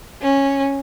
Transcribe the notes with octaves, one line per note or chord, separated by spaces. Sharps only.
C#4